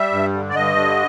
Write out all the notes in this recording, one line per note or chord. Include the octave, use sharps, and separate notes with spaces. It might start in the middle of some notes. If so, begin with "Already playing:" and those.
Already playing: G3 E5
G2
D3
D5
G2 D#5
D3